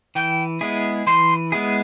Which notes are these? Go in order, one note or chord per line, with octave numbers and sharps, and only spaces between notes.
E3 G5
G#3 B3 E4 G#4
E3 C6
G#3 B3 E4 G#4